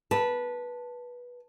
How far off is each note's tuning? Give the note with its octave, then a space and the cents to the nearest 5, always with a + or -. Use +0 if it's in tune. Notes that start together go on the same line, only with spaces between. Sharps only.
B4 -15 A5 +0